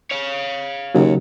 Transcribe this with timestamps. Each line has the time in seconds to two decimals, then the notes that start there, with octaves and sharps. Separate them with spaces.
0.11 C#5 F5
0.95 D#2 C#3 F#3